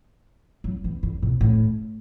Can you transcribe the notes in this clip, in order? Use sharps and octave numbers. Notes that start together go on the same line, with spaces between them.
F#3
E3
D3
B2
A2